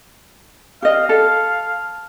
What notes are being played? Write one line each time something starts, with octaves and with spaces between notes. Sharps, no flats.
G4 D#5 F5
A4